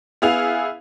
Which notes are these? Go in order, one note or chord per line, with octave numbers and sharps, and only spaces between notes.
B3 E4 G#4 F5 F7